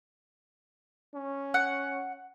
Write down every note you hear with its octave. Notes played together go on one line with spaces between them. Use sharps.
C#4
F#5